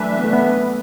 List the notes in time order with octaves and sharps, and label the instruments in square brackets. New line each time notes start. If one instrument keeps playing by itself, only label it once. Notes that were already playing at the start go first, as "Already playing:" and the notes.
Already playing: [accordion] E3 D4 B4 E5 [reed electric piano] F#3 A3
[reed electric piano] B3
A3
B3